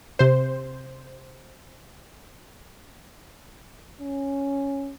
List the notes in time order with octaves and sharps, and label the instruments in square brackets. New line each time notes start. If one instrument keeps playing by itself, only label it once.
[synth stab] C3 C5
[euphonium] C#4